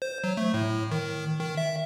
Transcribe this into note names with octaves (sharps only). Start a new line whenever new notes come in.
C5
F#3
A3
A2
D#3
D#3
E5